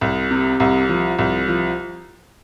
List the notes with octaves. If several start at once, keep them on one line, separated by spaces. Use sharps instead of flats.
C2
C3
C2
F3
C2
F3